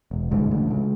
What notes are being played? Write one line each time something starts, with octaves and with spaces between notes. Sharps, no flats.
E1
G1 C#2 G#2
A1 D2
C#2